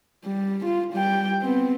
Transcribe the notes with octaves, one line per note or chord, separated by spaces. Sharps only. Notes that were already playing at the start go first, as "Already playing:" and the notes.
G3
F4
G3 G5
B3 C4